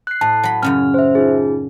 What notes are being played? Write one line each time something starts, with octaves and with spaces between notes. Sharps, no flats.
F#6 C7
A2 A5
F#3 B5
F#2 C#3 C#4 F6
C5 E5
D#4 F4 G#4